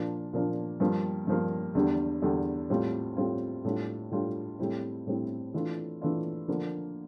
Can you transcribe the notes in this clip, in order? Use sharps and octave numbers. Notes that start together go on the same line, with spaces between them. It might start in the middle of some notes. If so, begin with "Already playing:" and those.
Already playing: A#2 F3 A#3 D4
A#2 F3 A#3 D4
G2 F3 A#3
G2 F3 A#3
E2 D3 G3 D4
E2 D3 G3 D4
A2 G3 C4 F4
A2 G3 C4 F4
A2 G3 D4 F4
A2 G3 D4 F4
A2 G3 C4 E4
A2 G3 C4 E4
E3 A3 D4 F4
E3 A3 D4 F4
D3 F3 A#3